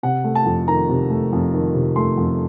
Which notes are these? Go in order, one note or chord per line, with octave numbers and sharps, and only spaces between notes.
C3 F#5
A3
A5
F2
D#3 A#5
C3
A3
F2
D#3
C3
A3 C6
F2